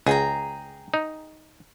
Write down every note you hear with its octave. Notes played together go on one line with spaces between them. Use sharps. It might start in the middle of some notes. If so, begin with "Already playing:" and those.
C#2 G#4 G5 A#5
D#4